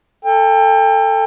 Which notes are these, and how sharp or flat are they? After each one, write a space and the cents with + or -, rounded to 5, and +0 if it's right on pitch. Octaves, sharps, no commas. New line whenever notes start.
A4 +15 G5 +35